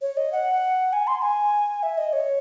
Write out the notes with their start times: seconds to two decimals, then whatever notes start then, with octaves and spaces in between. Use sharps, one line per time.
0.01 C#5
0.17 D#5
0.32 F#5
0.93 G#5
1.07 C6
1.22 G#5
1.83 E5
1.98 D#5
2.13 C#5